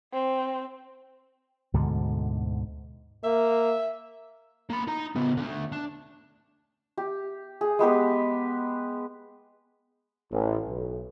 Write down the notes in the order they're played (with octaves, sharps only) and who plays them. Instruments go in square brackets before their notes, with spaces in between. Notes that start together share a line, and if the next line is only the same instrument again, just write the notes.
[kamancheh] C4
[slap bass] D2 G#2 B2 D3
[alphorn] A#3 [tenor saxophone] E5
[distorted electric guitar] A#3 B5
D#4 A#5
C#3 B3
D3 A3
D4
[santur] G4
G#4
G#3 B3 G4 B4
[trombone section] A1
B1